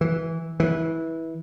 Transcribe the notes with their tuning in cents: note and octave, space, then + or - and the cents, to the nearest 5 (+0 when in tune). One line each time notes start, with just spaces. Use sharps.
E3 -10
E3 -20